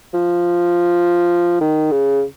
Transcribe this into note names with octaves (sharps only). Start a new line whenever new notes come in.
F3
D#3
C#3